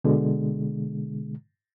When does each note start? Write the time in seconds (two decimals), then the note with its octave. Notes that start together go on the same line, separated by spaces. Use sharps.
0.04 B2 D3 G#3